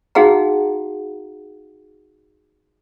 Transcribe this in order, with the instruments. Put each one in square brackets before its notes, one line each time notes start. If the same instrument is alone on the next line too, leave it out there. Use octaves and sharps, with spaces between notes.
[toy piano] D#4 F#4 G#4 F5 F#5 A#5